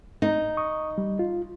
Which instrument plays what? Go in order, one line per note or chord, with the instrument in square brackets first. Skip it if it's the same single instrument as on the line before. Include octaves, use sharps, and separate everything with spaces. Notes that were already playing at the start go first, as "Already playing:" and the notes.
[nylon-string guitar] D#4
[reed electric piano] C#6 D#6
G3
F4